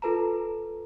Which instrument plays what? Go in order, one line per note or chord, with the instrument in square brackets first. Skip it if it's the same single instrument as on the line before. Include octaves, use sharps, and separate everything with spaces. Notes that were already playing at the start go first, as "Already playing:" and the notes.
[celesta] F4 A4 B4 A5 A#5